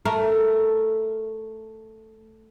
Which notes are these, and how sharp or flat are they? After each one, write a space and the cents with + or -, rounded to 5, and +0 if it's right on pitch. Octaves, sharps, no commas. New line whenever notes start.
A3 +0 A#4 +0